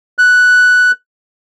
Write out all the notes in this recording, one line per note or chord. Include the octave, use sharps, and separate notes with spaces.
F#6